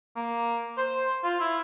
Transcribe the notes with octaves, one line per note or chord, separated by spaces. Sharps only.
A#3
C5
F4
E4